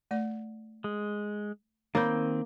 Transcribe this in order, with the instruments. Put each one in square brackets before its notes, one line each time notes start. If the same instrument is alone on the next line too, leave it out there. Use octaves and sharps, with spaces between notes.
[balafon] A3 D5
[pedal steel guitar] G#3
[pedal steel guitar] D#3 C4 G6 [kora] A#3 [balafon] C#5 B5